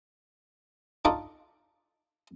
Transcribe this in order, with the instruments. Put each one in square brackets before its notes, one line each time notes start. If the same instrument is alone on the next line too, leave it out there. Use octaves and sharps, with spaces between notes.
[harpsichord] D4 D#4 F4 A4 D5 D#5